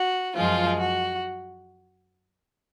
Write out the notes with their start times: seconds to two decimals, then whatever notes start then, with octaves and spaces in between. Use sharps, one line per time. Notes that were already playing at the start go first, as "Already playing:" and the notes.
Already playing: F#4
0.35 F#2 F3 G#3 F4
0.79 F#4